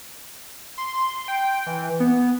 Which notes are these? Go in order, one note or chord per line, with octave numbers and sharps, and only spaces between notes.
C6
G5
E3
B3